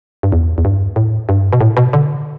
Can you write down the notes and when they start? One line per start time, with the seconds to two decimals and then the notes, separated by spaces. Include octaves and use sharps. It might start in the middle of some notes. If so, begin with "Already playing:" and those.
0.23 G2
0.32 E2
0.58 E2
0.65 G2
0.96 A2
1.29 G2
1.53 B2
1.61 A2
1.77 B2
1.93 D3